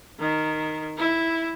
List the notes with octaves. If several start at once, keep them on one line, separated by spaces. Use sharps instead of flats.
D#3
E4